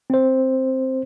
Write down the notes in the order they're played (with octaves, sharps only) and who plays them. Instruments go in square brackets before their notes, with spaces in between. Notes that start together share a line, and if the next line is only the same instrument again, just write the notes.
[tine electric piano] C4 C5